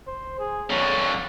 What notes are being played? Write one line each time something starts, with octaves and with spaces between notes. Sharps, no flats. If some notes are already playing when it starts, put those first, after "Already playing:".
C5
G#4
F2 D3 C#5